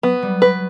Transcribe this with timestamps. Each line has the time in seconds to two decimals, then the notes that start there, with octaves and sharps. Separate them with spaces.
0.03 F#3 B3
0.22 G3
0.42 F#3 B4